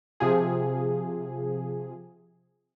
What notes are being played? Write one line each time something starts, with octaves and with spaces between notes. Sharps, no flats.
C3 F3 G#4